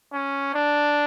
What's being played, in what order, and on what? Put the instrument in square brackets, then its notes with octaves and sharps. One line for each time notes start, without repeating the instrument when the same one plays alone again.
[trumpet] C#4
D4